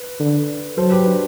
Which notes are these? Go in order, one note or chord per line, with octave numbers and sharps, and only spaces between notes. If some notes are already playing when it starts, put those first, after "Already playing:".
Already playing: B4
D3
F#3 A4 C5
G4 B4
D4